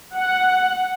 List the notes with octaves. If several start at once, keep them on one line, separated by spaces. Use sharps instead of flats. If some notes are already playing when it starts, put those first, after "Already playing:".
F#5